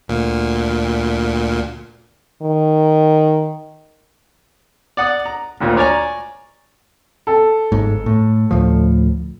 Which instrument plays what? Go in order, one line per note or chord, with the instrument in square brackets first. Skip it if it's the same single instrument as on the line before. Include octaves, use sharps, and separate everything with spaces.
[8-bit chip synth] D2 A#2
[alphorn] D#3
[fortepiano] D5 F#5 D#6
A#5
G#1 D2 A#2
C#5 D5 G#5 A#5
[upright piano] A4
[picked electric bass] G1 G#2
A2
D2 A2 F3